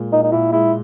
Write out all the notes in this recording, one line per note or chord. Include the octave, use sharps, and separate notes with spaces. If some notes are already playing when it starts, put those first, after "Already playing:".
Already playing: A#2 G#3
A#2 D#4
D#4
A#2 E4
G#3 E4